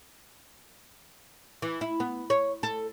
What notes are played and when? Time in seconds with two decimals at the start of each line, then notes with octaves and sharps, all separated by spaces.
1.62 E3
1.81 E4
2.00 B3
2.30 C#5
2.63 A4